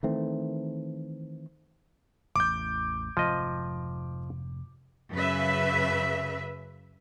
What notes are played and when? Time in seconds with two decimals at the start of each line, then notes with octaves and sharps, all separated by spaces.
0.03 D#3 E3 A3 C4
2.36 A1 E2 D6 G6
3.17 F1 G#2 F3 D#5
5.12 F#2 C#3 B4 E5